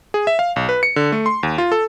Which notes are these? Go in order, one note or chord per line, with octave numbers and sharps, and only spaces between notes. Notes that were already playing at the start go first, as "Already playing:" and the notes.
G#4
E5
F5
B1
B4
C#7
D3
A3
C6
D#2
F4
A4